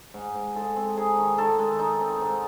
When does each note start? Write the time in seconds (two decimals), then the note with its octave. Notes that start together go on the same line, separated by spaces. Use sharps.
0.14 G#2
0.35 G#2
0.56 G#3 A4
0.76 C4
0.97 D#4 G#4
1.18 D#3
1.38 D#3 A4
1.59 G#3
1.79 D#4
2.00 C4
2.21 G#2